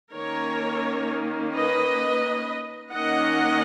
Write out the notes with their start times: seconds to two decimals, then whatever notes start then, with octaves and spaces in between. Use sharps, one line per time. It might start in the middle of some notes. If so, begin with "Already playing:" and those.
0.14 D#3 A#3 C#4 A#4 C#5
1.54 B4 D#5
2.93 D#3 A#3 C#4 D#5 F#5